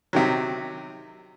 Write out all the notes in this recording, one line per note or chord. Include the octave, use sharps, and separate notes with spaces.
C3 D#3 F#3